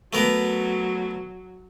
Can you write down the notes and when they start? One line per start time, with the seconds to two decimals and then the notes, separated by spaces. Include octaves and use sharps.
0.13 F#3 A3 B3 A#4